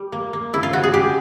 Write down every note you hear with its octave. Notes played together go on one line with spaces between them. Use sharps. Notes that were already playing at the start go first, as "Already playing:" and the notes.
Already playing: G3
A#3
A#3
C#3 E4
F4
C#3 F#4
G#4
G#3 G4